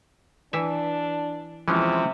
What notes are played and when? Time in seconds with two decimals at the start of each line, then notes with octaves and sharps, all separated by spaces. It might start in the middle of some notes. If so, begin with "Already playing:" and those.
0.53 E3 D4 E5
1.68 C3 E3 F3 G#3 C#4